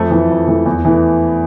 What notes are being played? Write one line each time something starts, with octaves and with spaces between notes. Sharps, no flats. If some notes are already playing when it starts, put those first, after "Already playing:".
Already playing: F2 A3 A4
E3 A3
F2
E3 A3
E2
E3 A3